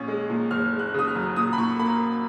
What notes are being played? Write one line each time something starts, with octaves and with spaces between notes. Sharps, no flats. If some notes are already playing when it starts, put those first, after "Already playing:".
Already playing: A#1 C#4
G#3
A#2
F#1 F6
G#3
F#6
C#3 D#6
F6
F#2
A#2 D#6
B5
A#2 C#6
A#3 B5